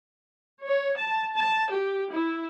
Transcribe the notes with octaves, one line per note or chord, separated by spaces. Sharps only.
C#5
A5
A5
G4
E4